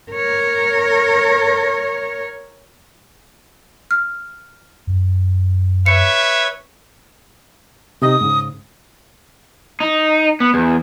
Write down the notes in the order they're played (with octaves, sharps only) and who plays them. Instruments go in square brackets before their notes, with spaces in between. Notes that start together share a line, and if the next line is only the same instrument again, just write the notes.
[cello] A#4 C#5
[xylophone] F6
[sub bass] F#2
[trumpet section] B4 C#5 E5 [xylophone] C#7
[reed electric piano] C3 D#4 D#5 [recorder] D#6
[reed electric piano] G#2 C#3
[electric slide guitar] D#4
B3
E2